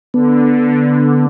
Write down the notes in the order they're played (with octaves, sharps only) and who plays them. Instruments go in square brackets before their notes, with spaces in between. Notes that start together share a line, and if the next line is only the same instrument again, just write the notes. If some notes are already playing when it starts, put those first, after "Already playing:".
[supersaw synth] D3 [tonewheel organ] B3